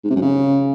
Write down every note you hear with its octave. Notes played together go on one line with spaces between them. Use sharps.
G#2
C3
F#2
C#3